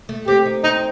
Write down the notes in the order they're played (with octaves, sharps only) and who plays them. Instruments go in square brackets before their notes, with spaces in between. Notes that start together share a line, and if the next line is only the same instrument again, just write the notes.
[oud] A3
[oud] C4 [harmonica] G4
[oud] D#4
[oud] C4 [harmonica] D#4